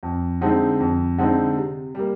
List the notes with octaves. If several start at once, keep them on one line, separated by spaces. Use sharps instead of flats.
F2
D3 G#3 C4 D#4
F2
D3 G#3 C4 D#4
C3
G3 A#3